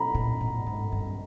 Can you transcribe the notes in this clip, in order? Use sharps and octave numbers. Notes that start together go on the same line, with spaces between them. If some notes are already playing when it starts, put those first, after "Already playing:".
Already playing: A#5 B5
A#2
A2
G#2
G2